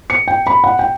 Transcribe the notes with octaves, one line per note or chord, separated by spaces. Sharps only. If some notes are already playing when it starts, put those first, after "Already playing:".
C#7
G5
B5
F#5
G5